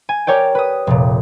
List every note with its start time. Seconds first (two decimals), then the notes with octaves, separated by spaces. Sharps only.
0.09 G#5
0.27 G4 A#4 C#5 D5 G5
0.55 B4 D#6
0.87 F1 A#2